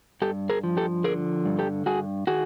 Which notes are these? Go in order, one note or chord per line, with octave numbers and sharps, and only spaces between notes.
G2 G4 A4
G#4 A#4
F3
G4 A4
D3 G#4 A#4
G2
G4 A4
G2 F#4 G#4
D#3 F#4 G#4